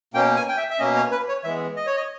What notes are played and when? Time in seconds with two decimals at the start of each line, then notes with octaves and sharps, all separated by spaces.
0.14 B2 A#3 C#4 G5
0.36 G#5
0.48 G5
0.57 E5
0.70 E5
0.79 B2 A#3 C#4 D#5
0.96 C#5
1.12 B4
1.28 C#5
1.44 E3 G#3 B3 E5
1.77 D#5
1.87 C#5
1.97 D#5